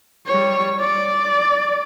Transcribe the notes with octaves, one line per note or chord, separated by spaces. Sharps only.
G3 C#5
D5